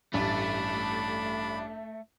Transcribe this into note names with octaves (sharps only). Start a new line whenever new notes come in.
A1 G2 A3 D4 B5